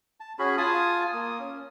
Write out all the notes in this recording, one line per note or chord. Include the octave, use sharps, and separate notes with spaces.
A5
C#4 F#4 G#4 B5
F4 G#5 A5 D#6
A#3 D#6
C#4